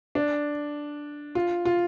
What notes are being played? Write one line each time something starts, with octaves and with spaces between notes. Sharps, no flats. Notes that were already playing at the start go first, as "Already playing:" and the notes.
D4
F4
F4